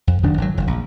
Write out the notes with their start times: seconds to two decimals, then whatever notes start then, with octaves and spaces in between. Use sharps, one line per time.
0.07 F2
0.23 F1 D#3 F#3 D4
0.38 G#1 F#3
0.54 F#1 F2
0.67 A#1